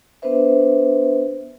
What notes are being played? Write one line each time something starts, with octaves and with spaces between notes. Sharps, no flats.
B3 D4 B4 C5 E5